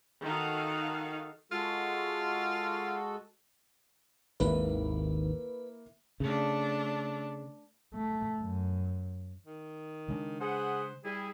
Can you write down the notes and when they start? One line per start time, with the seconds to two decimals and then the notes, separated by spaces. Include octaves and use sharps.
0.23 D#3 D#4 F#4 A4 F5
1.52 G#3 F4 F#4 A4
4.40 G#1 D#2 A#3 E4 B4
6.20 C#3 A3 D4
7.94 A3
8.40 F#2
9.46 D#3
10.08 C#3 G#3 D4
10.40 G#4 B4 C5 F#5
11.04 G3 E4 G4 G#4